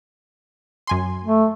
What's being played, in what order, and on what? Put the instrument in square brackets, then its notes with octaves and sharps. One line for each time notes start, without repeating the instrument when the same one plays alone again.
[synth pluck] F#2 G#5 C6
[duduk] A3